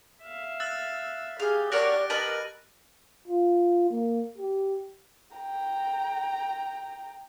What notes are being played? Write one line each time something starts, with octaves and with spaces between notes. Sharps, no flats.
E5 F5
E6 F#6 A6
G4 G#4 F5
F#4 A#4 C#5 D5 F#6 A#6 D7
A#4 B4 D#5 A5 D#7 F#7
F4
A#3
G4
G5 A#5